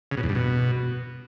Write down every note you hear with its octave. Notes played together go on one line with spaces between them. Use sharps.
C#3
B2
E2
G2
B2